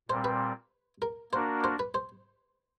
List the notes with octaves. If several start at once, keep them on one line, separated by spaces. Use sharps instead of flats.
A#2 G3 C4 C5
B4
A#4
A#3 D4 F#4 A#4 C5
C5
B4
C5